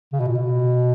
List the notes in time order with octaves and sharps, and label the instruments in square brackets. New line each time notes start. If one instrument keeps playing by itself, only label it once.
[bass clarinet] C#3
B2
A#2
B2